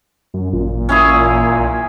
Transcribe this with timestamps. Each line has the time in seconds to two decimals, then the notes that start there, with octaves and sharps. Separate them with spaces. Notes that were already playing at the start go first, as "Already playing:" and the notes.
0.34 F#2
0.53 A1 A#2
0.89 C#4 E4 G#4
1.58 B1